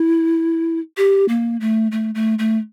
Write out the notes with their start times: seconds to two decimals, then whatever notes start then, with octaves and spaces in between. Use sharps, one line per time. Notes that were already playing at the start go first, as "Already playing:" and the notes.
Already playing: E4
0.97 G4
1.29 A#3
1.61 A3
1.92 A3
2.15 A3
2.39 A3